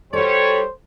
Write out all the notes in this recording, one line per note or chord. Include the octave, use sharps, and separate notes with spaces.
G3 F#4 A4 C5 C#5